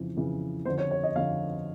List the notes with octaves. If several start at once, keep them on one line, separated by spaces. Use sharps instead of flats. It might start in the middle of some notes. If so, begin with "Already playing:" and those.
Already playing: F2 C#3 E3
F2 C#3 E3
F2 D3 C5
C#5
C#5
D#5
F2 D3 F5